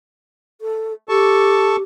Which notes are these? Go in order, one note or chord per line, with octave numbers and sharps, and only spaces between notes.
A4
G4 A4 A5 C#6